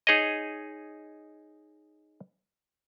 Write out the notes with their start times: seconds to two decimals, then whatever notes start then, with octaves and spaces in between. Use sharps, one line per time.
0.07 D#4 G#4 C#5 D#5